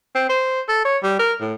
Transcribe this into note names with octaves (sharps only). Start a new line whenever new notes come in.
C4
C5
A4
C#5
G3
A#4
A2